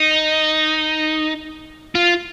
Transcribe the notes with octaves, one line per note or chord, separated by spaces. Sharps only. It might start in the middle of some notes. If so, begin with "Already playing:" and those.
Already playing: D#4
F4